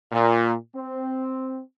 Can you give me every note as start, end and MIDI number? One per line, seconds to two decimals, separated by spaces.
0.12 0.54 46
0.75 1.59 60